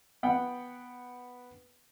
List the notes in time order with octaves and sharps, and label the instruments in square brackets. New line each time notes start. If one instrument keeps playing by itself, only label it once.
[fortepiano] B3 F#5 G5